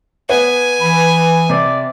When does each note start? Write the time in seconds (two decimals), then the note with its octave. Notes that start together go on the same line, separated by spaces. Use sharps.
0.30 B3 G#5
0.81 E3 B5
1.50 C3 D5